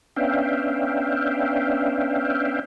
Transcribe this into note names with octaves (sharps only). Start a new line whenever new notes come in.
B3 C#4 D4 E5 F5 G5